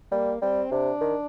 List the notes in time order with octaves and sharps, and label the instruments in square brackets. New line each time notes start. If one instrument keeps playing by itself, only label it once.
[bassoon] G3 [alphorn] A#3
[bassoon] G3 [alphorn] C4
[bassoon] C3 [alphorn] D4
[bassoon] D#3